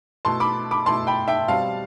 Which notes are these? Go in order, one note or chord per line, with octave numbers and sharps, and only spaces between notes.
B2 A3 E4 A5 C6
B5 D6
B5 D6
B2 A3 E4 A5 C6
G5 B5
E5 G5
B2 G3 C4 F5 A5